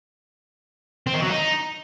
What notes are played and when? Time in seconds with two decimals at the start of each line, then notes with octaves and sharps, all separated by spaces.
1.07 C4
1.14 D#3
1.22 F#3
1.30 D#4